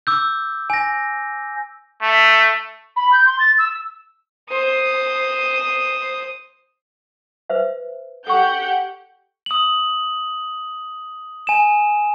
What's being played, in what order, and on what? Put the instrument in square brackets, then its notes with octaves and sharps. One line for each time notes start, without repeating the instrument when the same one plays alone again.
[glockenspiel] D6 E6 G6
G#5 A#6
[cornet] A3
[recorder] B5
G6
C6
A6
E6
[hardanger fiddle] C5 D#6
[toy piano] B4 C5 E5
[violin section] G4 F#5 G6 [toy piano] A4 C#6
[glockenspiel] D#6 F#7
G#5 E7